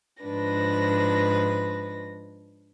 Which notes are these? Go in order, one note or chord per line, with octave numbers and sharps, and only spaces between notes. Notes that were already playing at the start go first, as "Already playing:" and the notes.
G#2 F3 D4 B4 A#6